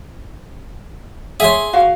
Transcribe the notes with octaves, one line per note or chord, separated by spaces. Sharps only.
G#4 C#5 E5 C6
F#4 F5